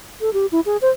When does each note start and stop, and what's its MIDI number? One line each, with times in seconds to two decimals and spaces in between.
0.21 0.33 69
0.33 0.46 67
0.52 0.60 64
0.66 0.77 68
0.82 0.90 72